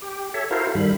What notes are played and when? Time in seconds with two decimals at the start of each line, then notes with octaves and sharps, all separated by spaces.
0.02 G4
0.34 A4 C#5 E5
0.51 E4 F#4 A4 A#4 C5 F5
0.75 G2 D#3 G3 B5